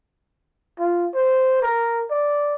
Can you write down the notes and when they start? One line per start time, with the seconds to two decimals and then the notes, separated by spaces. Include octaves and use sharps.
0.79 F4
1.15 C5
1.63 A#4
2.11 D5